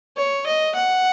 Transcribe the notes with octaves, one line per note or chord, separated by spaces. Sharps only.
C#5
D#5
F#5